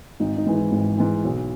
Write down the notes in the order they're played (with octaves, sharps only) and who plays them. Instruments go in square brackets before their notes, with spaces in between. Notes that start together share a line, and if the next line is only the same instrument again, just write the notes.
[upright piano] G#1 D#4
D#4
G#2 E3
E4
G#1
G#2 E3
B1